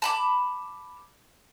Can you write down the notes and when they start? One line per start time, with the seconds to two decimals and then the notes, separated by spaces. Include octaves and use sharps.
0.02 A5 B5 D6